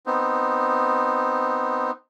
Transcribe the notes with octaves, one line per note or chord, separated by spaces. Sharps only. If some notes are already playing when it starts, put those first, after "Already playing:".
B3 C4 D#4